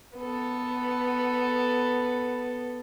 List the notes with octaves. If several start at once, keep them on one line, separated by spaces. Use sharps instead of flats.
B3 A4